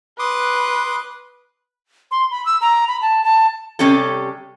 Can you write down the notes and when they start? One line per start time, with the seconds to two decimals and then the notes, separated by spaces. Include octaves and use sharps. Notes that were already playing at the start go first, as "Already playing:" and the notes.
0.19 B4 C6 D6 D#6
2.11 C6
2.31 B5
2.46 E6
2.61 A#5
2.88 B5
3.02 A5
3.24 A5
3.79 C3 G3 C#4 G4 A4